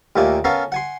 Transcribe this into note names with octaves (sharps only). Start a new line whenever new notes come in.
D#2 A#2 A3 A#3 G#5
B3 C#4 A4 A#4 F5 G#5
F#5 G#5 C6